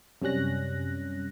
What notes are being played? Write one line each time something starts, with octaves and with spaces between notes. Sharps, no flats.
F#2 C3 G3 C#4 F#6 A#6